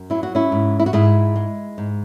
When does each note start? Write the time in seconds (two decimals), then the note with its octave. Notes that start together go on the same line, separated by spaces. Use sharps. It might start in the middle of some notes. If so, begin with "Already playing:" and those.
Already playing: F#2
0.10 F#3 E4
0.23 F#4
0.35 C#4 E4
0.52 G#2
0.80 E4
0.86 F#4
0.93 G#2 E4 G#4
1.36 G#3
1.78 G#2